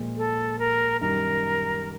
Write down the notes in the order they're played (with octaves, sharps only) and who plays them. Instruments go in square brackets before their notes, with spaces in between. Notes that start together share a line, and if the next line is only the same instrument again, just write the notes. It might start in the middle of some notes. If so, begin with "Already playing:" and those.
Already playing: [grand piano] A#2 F3 G#3
[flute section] A4
A#4
[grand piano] F#2 D#3 G3 [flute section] A#4